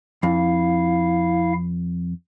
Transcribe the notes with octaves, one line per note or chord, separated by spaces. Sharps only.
F2 E4 F5